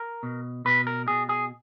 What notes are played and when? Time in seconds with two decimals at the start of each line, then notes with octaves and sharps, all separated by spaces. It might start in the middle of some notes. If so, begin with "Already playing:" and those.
Already playing: A#4
0.23 B2
0.65 B2 B4
0.87 A#4
1.08 B2 G#4
1.29 G#4